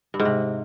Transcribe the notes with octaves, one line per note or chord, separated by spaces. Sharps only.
G2
G#2
C3